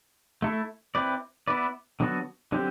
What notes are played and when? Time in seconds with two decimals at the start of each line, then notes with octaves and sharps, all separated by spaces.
0.42 A3 E4 A4
0.95 C4 E4 B4 D5
1.48 B3 E4 B4 D5
2.00 D3 F#3 B3 F#4 A4
2.52 D3 F#3 C4 G4